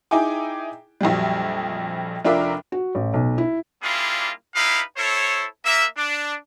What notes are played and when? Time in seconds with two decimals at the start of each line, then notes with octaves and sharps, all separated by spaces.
0.11 D#4 E4 G#4 G5 G#5 D6
1.01 A#1 F2 F#3 G3
2.25 F1 D4 F4 A#4 E5 D6
2.72 F#4
2.95 A1
3.14 B1
3.38 E4
3.83 G3 A#3 D4 E4 F4 G#4
4.56 D#4 E4 G4 B4 F5
4.97 E4 A4 C5 C#5
5.65 A#3 E5
5.97 D4